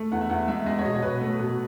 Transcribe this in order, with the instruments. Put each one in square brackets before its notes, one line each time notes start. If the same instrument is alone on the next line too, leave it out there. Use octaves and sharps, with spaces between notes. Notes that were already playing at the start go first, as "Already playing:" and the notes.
Already playing: [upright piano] A3
E2 F#5
E5
E2 F#5
G#3 E5
G#3 D#5
C#5
B2 D#5
C#5
B2 B4
A3
B2